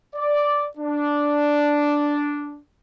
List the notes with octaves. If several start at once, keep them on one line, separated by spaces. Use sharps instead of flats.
D5
D4